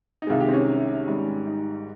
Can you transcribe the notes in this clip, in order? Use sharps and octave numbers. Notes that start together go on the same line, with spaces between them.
D#4
C2 C3 D#3 G#3 F4
G4
C4
C#4
G#1 G#2 G3
D#4